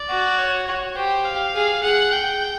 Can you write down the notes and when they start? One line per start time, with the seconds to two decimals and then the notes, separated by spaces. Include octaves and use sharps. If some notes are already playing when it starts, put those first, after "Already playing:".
Already playing: D5
0.09 F#4
0.38 C#5
0.67 C#5
0.96 G4 C5
1.25 F5
1.55 G#4
1.83 G#4 F#5
2.13 G5